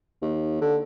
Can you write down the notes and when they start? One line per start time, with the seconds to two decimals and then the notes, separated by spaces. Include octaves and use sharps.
0.22 D#2
0.61 D3